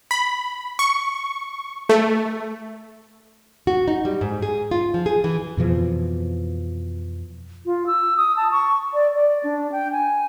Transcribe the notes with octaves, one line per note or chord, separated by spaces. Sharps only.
B5
C#6
A3
F#4
D#4
G3
G#2
G#4
F4
F3
G#4
E3
F2 B2 E3 F3
F4
E6
D#6
A5
C#6
D5
D5
D4
G5
G#5